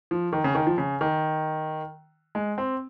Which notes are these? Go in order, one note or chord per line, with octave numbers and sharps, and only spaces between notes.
F3
D#3
C#3
D#3
F3
C#3
D#3
G#3
C4